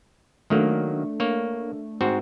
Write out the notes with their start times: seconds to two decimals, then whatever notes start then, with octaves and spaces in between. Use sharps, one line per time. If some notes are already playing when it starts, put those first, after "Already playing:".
0.50 D#3 F#3 A3 A#3 D4
1.20 A#3 C#5
2.01 G#2 C4 F#4